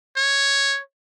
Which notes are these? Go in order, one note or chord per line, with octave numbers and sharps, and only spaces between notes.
C#5